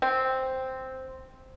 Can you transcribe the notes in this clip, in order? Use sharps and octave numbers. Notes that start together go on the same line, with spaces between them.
C4